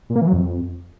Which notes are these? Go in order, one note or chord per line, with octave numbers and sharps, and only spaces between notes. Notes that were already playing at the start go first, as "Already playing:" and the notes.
A#2
A#3
E3
F#3
F2